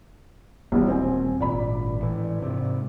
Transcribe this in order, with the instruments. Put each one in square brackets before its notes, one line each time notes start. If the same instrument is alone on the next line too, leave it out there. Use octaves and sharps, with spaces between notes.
[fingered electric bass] D#1 [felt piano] B1 E3 G3
[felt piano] C4 G#5
[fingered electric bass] G#1 A#2 [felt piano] D5 B5
[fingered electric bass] A2 E3
G#2 C3